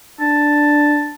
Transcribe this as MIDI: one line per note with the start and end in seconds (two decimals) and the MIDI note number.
0.20 1.13 62
0.20 1.14 81